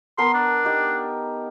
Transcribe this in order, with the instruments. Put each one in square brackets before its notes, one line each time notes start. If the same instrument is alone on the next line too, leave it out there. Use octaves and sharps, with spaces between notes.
[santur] B3 A#4 A5 [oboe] C6
[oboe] D4
[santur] D#4 G4